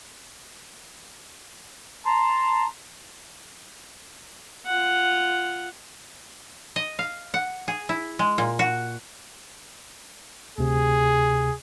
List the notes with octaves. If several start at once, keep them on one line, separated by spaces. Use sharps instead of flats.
A5 A#5 C6
F4 F#5
D#5
F5
F#5
G#4
E4
G#3
A#2
F#4
D2 C3 G#4